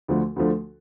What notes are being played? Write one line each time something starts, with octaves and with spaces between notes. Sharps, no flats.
D2 D3 F3 A3
D2 D3 F3 A3